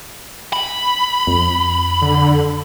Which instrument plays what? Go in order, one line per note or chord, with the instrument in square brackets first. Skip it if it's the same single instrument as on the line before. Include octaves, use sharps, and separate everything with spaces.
[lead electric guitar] B5
[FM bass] F2
[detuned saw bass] D3